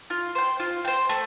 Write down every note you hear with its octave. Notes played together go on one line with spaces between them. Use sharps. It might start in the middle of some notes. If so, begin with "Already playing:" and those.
F4
C5 G5
F4
C5 G5
A3